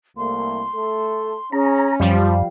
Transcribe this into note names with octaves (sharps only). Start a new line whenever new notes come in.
C2 A3 A#3 C6
A3 A4
C#4 G#4 A#5
F#2 F3 G3 F5